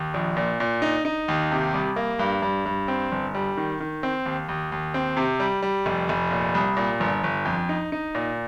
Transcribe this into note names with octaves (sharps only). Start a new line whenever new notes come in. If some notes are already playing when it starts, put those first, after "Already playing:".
Already playing: D#2
A#1
A#2
A#2
D#4
D#4
D#2
C3
C2
A#3
G2
G2
G2
C4
G1
G3
D#3
D#3
C4
D#2
D#2
D#2
C4
C3
G3
G3
F1
F1
A#2
C2
A#2
G1
G1
F2
D#4
D#4
A#2